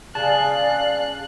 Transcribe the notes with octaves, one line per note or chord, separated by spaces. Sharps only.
C#3 G#4 D5 F5 A5 F#6